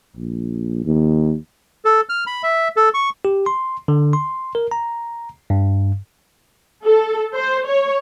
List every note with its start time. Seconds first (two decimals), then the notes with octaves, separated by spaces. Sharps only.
0.17 A#1
0.85 D#2
1.85 A4
2.09 F6
2.27 B5
2.43 E5
2.77 A4
2.94 C#6
3.25 G4
3.46 C6
3.88 D3
4.13 C6
4.55 A#4
4.71 A#5
5.50 G2
6.85 A4
7.35 C5
7.66 C#5